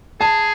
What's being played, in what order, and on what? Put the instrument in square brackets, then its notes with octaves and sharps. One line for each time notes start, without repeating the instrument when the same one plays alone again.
[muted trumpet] G#4 [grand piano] A5